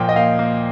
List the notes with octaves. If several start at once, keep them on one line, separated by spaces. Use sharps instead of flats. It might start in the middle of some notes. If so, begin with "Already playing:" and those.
Already playing: A#2 F3 A#3 G5
D#5
A#3 F5
A#3